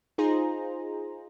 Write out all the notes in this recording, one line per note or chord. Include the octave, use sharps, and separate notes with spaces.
D#4 F4 G#4 C5 A#5